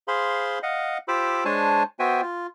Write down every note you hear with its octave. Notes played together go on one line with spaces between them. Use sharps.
G#4 C5 F5 B5 C6
D#5 F5 F#5
F4 G4 C5 B5 D6 E6
G#3 D4 C5 C#5 G#5 A5
B3 F#4 C5 E5 G5 G#5
F4